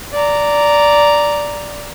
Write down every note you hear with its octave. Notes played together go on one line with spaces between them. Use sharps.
D5 A#5